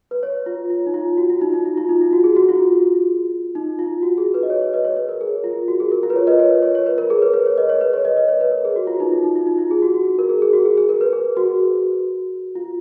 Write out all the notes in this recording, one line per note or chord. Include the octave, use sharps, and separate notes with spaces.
B4
C#5
F4
F4
D#4
F4
F#4
F4
D#4
D#4
F4
F4
D#4
F4
F#4
G#4
F#4
F4
D#4
F4
F#4
G#4
B4
D#5
C#5
C#5
B4 D#5
C#5
B4
A#4
G#4
F4
F4
F#4
G#4
A#4
F4
B4
C#5
B4 D#5
C#5
B4
C#5
C#5
B4
A#4
G#4
B4
B4
C#5
B4 D#5
C#5
B4
C#5
B4 D#5
B4 D#5
C#5
B4
A#4
G#4
F#4
F4
D#4
F4
D#4
F4
D#4
F4
G#4
F#4
F#4
A#4
G#4
G#4
F#4
G#4
G#4
A#4
B4
G#4
F#4
F4